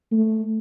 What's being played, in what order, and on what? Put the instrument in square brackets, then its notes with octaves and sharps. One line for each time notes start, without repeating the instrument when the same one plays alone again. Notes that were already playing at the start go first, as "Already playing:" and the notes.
[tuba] A3